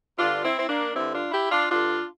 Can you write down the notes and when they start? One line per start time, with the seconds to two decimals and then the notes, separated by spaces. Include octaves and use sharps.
0.18 G2 D3 D4 F4
0.43 C4 E4
0.58 C4
0.68 A#3 D4
0.94 G2 D3 C4 E4
1.13 D4 F4
1.32 E4 G4
1.51 D4 F4
1.70 G2 D3 D4 F4